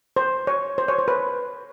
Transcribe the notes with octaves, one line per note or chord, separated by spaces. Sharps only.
C5
C#5
C5
C#5
C5
B4